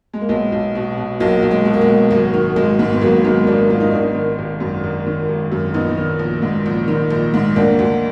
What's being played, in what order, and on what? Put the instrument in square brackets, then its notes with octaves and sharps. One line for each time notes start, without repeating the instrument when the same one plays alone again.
[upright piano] G#3
A#3
B1 G#3 B3
B1
B2
B2
B1 F#3 A#3
B1
G#3
B2
A#3
G#3
B2
G#1 F#3
D#3
G#1 G#3
G#2
B3
G#1 F#3 A#3
D#3 G#3 B3
G#1 A#3 D4
G#2 F4
D#4
G#1 D4
B3 D#4
D#3
G#1
F#2
G#1
D#3
G#1
F#2
A#1 B3 D#4
D#3
A#1
G#2
A#1
D#3
A#1
G#2
D2 A#3 D4
D2